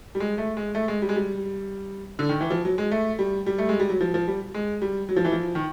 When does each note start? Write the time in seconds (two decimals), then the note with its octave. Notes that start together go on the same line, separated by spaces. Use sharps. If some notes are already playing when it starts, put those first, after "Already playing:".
0.15 G3
0.20 G#3
0.38 A3
0.57 G#3
0.75 A3
0.88 G#3
1.02 G3
1.09 G#3
1.16 G3
2.19 D3
2.29 D#3
2.41 E3
2.51 F3
2.65 F#3
2.78 G#3
2.91 A3
3.19 G3
3.46 G3
3.58 A3
3.69 G#3
3.80 G3
3.90 F#3
4.01 F3
4.14 F3
4.28 G3
4.54 G#3
4.82 G3
5.09 F#3
5.16 F3
5.25 E3
5.32 F3
5.55 D#3